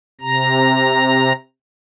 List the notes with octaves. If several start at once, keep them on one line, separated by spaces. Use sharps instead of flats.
C3 A#5